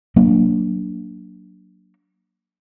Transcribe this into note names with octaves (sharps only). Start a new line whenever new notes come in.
F#3 A#3 D4